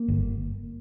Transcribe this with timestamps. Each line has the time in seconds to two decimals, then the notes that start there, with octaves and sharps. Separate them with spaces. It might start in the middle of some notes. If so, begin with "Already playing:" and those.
Already playing: A#3
0.08 G1